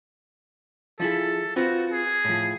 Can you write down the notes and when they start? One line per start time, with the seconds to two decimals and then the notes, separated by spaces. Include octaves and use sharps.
1.00 F3 E4 G#4 A4
1.56 C4 F4 F#4 B4
1.92 G#4
2.25 A2 F3